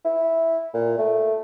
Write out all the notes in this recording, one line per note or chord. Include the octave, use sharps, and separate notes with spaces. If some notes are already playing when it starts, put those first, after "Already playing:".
E4
A#2
A3